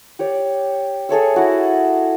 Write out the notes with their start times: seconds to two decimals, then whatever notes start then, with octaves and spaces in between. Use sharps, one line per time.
0.19 G4 C#5 D5
1.09 G#4 A4 C#5 E5
1.34 E4 F#4 D5